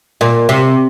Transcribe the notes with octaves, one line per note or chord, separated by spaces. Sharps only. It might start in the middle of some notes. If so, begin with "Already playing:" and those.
A#2
C3